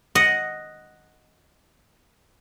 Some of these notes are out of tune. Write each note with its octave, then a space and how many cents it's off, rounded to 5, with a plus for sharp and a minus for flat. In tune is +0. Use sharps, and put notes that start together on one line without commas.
D#5 +0 F#5 +0